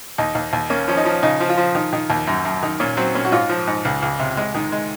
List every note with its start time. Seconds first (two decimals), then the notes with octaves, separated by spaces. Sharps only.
0.18 D#2 D#4
0.35 D#2
0.53 D#2
0.70 A#3 C#4
0.88 F3 C#4
0.97 D#4
1.05 F3
1.23 C#3 D#4
1.40 F3
1.49 F4
1.57 F3
1.75 D#3
1.93 D#3
2.10 D#2
2.27 F#2
2.45 F#2
2.63 D#3
2.80 A#2 C#4
2.97 F#3 C4
3.15 A#2 C#4
3.25 F#4
3.32 G#2 F4
3.49 F3
3.67 G#2
3.85 C#2
4.02 C#2
4.20 C3
4.37 G#3
4.55 D#3
4.72 G#3